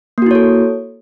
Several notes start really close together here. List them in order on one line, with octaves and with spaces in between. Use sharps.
A#3 F#4 E4 C#5 A4